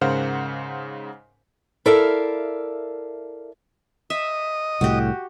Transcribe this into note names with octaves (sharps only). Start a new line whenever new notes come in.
G#2 C#3 A#4 C5 F5 F#5
E4 A4 A#4 D5 E5 F5
D#5 E5
C2 A2 F#4 G4